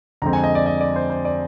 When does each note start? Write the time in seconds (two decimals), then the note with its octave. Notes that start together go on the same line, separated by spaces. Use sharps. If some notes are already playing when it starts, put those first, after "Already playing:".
0.22 F2 D3 G#3 C4 A#5
0.33 G#5
0.44 D#5
0.55 D5
0.66 D#5
0.81 D5
0.96 C5
1.10 C5
1.25 D5